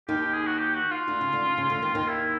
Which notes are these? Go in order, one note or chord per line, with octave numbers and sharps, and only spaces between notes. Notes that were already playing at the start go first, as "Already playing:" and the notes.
D#2 D#3 G4
G#4
F#4
G4
F#4
F4
D2 D3
C#3
D2 D3
C#3
C#3
D2 D3
D#2 D#3
D#2 D#3
E4